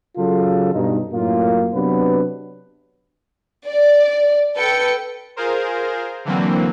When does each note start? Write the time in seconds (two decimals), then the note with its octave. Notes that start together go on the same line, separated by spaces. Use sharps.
0.17 C#3 F#3 F4 A4
0.73 G2 B2 D#4
1.12 F#2 A2 A#3 C#4 F4
1.73 C3 F#3 B3 D4 B4
3.68 D5
4.57 A4 B4 G5 C#7
5.36 F4 G#4 A#4 C5
6.25 D3 E3 F#3 A#3 C4